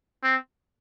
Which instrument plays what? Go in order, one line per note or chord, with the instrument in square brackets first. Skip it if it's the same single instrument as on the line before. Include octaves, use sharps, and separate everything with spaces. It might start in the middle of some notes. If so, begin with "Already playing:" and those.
[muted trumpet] C4